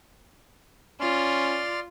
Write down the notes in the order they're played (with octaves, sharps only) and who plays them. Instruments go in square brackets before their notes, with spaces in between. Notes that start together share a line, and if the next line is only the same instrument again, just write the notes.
[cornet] C#4 [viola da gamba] F4 [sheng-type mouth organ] D5 C6 F6